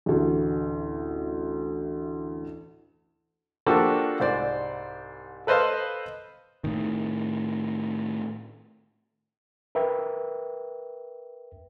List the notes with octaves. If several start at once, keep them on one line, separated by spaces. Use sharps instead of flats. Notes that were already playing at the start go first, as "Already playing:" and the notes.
A1 D2
F3 A#3 D4 F#4 G4 A4
C2 G#2 C5 D5
A4 B4 C5 D#5 F5
A2 D#3
A#4 B4 E5 G5